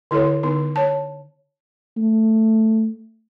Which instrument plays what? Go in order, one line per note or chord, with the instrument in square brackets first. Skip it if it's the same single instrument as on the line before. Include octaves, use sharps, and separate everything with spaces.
[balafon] D3 E4 A4 C#5
D3 B3 D#4
C#5 A5
[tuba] A3